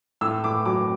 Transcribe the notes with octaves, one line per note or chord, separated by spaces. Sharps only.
A2 E6
A2 D6
F#3 D6